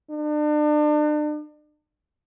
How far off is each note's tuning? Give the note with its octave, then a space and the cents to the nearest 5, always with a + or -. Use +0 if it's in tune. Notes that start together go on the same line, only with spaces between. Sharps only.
D4 +40